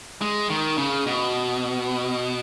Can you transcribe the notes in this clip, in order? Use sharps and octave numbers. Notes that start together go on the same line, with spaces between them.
G#3
D#3
C#3
B2